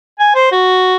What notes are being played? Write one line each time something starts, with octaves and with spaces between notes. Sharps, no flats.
G#5
C5
F#4